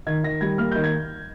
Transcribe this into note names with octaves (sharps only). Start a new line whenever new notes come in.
D#3 G#6
D#3 A#6
G3 G#6
A#3 F6
D#3 G6
G#6